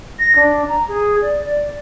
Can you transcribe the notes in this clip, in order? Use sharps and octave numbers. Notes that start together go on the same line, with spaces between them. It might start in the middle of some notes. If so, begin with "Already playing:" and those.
A#6
D4
A#5
G#4
D5
D5